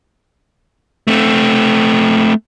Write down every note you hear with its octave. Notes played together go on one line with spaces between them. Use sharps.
A3 C4